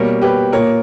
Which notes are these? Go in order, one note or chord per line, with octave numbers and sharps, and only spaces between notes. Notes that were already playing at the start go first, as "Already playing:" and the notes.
Already playing: B2 G3 A#3 A#4 C#5
G4 B4
A#2 A#3 A#4 C#5